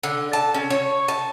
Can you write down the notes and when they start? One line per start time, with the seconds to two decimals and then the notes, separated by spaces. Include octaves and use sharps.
0.03 D3
0.33 A5
0.54 C#4
0.70 C#5
1.08 A5